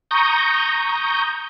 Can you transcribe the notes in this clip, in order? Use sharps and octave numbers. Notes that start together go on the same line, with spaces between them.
A#5 C#6 D#6 G6